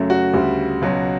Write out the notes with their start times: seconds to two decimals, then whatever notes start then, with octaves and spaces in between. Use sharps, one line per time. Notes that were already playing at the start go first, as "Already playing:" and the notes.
Already playing: F#2 C#3 F#3 A3
0.10 F#4
0.34 D2 C#3 G3
0.81 C#2 B2 F#3